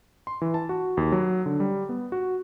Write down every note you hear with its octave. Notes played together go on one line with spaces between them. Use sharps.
C6
E3
A5
F#4
D#2
F#3
D3
G3
B3
F#4